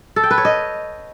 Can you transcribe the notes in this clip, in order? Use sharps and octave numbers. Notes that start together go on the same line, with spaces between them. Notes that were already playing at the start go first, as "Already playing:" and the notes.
A4
G5
B4
C#5
D#5